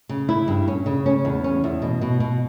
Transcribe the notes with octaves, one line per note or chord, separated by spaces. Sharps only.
C#3
E4
G2
C#4
C#3
C#4
E2
C#4
E2
B2
B2
B2